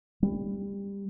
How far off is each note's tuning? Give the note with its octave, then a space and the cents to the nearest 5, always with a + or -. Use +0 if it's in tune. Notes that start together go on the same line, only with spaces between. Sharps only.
G3 +20